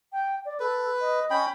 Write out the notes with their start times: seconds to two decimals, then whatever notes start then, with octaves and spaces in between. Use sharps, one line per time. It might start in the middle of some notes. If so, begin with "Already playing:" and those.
0.13 G5
0.45 D5
0.60 A4 B4
1.01 D#5
1.30 C#4 G5 B5